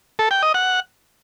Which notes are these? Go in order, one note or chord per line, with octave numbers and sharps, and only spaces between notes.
A4
G5
D#5
F#5